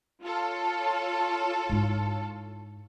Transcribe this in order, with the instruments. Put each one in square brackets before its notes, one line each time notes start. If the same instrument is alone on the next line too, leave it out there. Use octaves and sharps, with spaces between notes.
[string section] F4 A4 C#5
[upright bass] G#2 E4